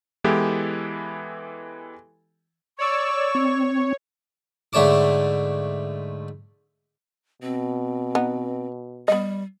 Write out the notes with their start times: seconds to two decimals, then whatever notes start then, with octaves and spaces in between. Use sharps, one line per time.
0.24 E3 G#3 B3 E4 G4 A4
2.78 C#5 D5 C#6 E6
3.35 C4 C#5
4.73 G#2 D3 A3 C#5 A5 D6
7.42 B2 C4
8.15 B3 D#4
9.08 G3 B3 D#5